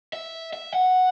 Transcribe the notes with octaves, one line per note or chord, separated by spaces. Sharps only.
E5
E5
F#5